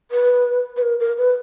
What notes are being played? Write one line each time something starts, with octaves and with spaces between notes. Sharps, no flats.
B4
B4
A#4
A#4
B4